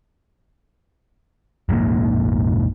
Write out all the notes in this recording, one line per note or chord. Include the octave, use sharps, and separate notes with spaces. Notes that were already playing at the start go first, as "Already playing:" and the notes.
F1 A#1 G#2 A#3